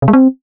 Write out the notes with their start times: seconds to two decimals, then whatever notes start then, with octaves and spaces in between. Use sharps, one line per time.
0.02 C3
0.08 G#3
0.13 C4